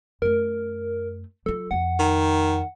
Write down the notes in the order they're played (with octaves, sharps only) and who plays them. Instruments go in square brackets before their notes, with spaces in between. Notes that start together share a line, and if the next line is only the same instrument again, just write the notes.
[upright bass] F#2 A3 [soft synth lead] A#4
[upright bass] F#3 F4 [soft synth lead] A4
[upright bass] F2 F3 [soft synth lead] F#5
[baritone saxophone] D#3